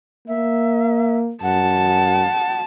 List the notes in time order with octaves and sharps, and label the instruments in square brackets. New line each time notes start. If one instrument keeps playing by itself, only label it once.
[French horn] A#3 [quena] E5
[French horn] F#2 [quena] F#5 [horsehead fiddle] A5